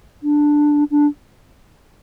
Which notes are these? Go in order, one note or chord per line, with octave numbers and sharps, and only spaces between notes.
D4
D4